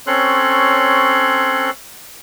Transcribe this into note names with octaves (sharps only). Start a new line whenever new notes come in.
C4 C#4 A4 C#5 C6 F#6